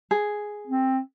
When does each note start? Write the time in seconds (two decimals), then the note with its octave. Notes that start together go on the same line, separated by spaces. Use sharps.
0.11 G#4
0.67 C4